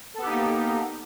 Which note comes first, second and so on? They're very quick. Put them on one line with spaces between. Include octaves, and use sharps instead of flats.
A4 B3 G4 D#4 A#3